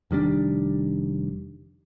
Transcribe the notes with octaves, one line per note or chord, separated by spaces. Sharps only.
F1 D#3 G3 D4